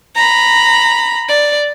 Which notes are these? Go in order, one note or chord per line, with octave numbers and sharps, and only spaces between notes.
A#5 B5
D5